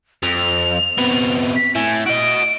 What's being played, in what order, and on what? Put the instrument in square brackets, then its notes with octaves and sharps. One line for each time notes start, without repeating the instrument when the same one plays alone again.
[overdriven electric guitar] F2 [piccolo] F7
[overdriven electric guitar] C3 B3
[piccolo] B6
[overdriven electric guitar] A2 [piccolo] G#5
[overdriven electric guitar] F#4 D#5 [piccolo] D7